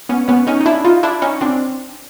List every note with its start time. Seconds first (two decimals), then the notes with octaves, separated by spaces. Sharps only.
0.09 B3 C#4
0.28 B3 C#4
0.47 C#4 D#4
0.61 D#4
0.66 D4 E4
0.84 D#4 F4
1.03 D4 E4
1.22 C#4 D#4
1.41 C4 D4